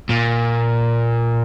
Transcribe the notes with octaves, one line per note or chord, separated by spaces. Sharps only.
A#2